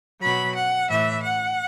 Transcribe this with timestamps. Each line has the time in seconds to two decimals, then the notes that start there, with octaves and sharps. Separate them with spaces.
0.22 B2 F#3 B5
0.55 F#5
0.90 A2 E3 E5
1.23 F#5